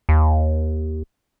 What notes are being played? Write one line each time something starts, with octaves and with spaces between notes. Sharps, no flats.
D#2